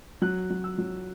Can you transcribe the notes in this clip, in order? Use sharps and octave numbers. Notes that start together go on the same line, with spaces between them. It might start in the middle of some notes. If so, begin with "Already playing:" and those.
F#3 F#6
F#3
E6
F#3